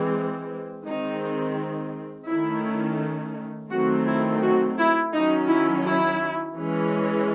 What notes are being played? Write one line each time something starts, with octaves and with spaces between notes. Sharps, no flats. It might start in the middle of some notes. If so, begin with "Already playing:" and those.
Already playing: E3 G#3 C4
D#3 G#3 C4 D#4
D#3 A3 C#4 E4
D#3 F#3 A3 C4 F#4
E4
F#4
E4
D#3 F#3 C#4 D#4
E4
E4
E3 G#3 C#4